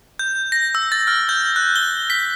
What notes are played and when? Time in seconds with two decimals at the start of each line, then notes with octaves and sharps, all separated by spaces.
0.19 G6
0.52 A#6
0.75 E6
0.92 A6
1.07 F6
1.29 G6
1.56 F#6
1.76 G7
2.10 B6